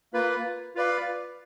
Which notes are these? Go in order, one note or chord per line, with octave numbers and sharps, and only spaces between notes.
A#3 F4 B4
F4 B4 D5 F5